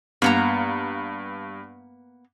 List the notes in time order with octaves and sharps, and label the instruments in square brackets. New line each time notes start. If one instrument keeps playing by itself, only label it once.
[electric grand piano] G2 [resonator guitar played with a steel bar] A#3 B3 A#5